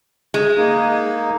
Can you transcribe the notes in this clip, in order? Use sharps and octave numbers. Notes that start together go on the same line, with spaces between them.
G#3
A#3 D#4